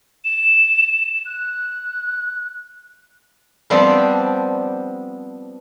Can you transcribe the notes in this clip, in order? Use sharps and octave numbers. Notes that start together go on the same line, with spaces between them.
E7
F#6
F3 G3 B3 C4 D4 G4